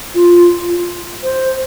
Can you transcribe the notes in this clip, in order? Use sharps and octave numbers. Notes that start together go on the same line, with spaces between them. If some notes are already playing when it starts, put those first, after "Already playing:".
F4
C5